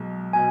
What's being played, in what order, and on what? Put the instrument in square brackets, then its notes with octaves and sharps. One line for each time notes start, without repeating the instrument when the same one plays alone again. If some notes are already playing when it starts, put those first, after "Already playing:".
Already playing: [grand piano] B1 B2 G#3
[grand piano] B2 [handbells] G#5